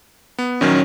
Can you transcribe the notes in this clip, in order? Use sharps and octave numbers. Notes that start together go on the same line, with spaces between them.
B3
A#1 D#3 F#3 C#4